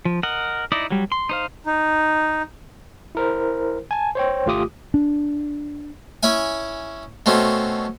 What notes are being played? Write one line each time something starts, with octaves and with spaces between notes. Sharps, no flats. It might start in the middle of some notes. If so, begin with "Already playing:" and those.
F3
A#4 D#5 F#5
D#4 E4 D5 D#5
F#3 G3
C6
D#4 C5 F5
D#4
E4 A#4 C5
G#5 A5
C5 C#5 G5
G#1 A3 F4 G4 D6 D#6
D4
C#4 E4 E5 G#5
B2 A3 C4 C#4